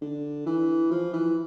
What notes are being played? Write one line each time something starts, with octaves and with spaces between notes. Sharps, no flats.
D3
E3
F3
E3